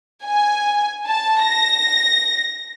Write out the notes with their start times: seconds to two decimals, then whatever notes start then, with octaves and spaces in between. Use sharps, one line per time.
0.24 G#5
1.06 A5
1.43 A#6